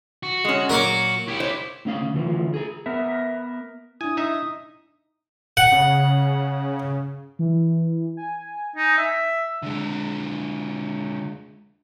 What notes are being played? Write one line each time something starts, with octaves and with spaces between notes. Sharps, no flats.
F#4
G#3 C#4
A#2 F#3 A#3 A#4 C#5 D6
E4 G4
C5 C#5
A2 C#4 F5
D2
D2 E3 F3
G#4 A#4
B3 A#4 E5
D4 E4 G#5 D#6
D#4 E5 D#6
F#5
C#3
E3
G#5
D#4
E5
D3 G#3